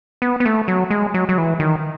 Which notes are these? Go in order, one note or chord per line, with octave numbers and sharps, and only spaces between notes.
B3
B3
A3
F#3
G#3
F#3
F#3
E3
D#3